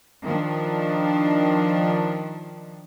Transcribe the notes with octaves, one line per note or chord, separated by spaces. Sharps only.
D#3 F3 D4